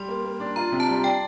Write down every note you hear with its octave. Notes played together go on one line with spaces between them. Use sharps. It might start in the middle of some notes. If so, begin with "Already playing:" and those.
Already playing: G3 C6
A#3
A#3
D4
F4 A#5
C3
A5
G3
D5 G5